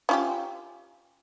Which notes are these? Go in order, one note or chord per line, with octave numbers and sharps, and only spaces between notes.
C#4 F4 G4